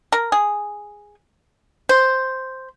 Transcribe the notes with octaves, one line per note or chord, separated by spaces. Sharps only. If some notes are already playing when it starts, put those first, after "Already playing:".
A#4
G#4
C5